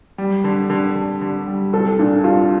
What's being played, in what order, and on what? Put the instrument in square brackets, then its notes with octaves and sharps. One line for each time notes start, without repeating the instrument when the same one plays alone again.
[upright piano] G3
D3
D3
D3
D3
G3
[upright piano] C2 [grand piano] A4
[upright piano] A#2 [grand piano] D4
[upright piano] C2 [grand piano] F4